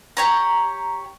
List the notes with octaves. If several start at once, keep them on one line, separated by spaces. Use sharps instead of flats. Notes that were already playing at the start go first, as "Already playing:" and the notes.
G4 C#5 A#5